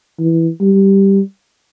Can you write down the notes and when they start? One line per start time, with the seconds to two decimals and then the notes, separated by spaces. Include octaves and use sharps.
0.19 E3
0.61 G3